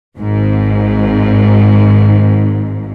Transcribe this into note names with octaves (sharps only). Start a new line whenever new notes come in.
G#1 G#2